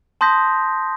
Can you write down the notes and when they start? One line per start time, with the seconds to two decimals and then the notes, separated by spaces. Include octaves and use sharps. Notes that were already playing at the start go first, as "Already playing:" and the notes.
0.21 A5 C6 D#6 G6 A#6 B6